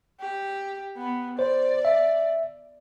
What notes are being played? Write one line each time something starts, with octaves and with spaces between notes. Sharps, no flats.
G4
B3
C5 D5
E5